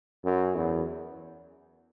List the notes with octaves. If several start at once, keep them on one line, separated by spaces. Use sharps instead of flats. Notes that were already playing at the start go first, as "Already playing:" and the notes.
F#2
E2